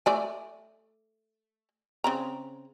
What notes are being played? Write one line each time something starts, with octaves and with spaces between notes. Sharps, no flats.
A3 D5 G#5
C#3 C4 A#5